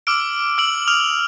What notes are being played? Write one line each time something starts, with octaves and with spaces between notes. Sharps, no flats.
D6 E6 F6 D7
E6 D7 F#7
D#6 F6 F7